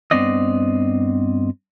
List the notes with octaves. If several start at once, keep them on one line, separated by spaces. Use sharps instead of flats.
G2 B3 C4 D5 D#5